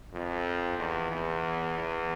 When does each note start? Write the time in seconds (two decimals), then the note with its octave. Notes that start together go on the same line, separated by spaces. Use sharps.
0.13 F2
0.78 E2
1.12 E2
1.78 E2